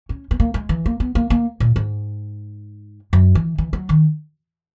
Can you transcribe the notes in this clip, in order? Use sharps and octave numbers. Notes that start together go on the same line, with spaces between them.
C#4
B3
A#3
G#3
E3
A#3
B3
A#3
A#3
A#2
G#2
F#2
E3
E3
F#3
D#3